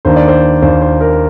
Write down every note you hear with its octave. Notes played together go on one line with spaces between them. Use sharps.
D#2 D#3 A#3 D4 C5
D5
C5
D#2 D#3 A#3 D4 C5
C5
A#4